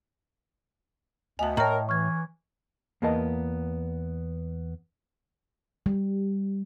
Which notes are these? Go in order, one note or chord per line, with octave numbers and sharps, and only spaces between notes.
D2 B3 D#5 G#5 A5
A2 A#4 C#5 D#5 G5 A5 A#5
E3 C#6 F6 G#6
E2 A#3 B3 A#4 D#5 A5
G3